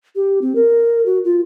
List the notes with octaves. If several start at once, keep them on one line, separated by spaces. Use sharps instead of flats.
G4
C4
A#4
F#4
F4